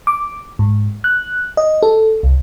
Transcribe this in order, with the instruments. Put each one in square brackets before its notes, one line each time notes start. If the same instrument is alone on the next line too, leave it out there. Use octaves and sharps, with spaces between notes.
[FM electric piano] D6
G#2
F#6
D#5
A4
C2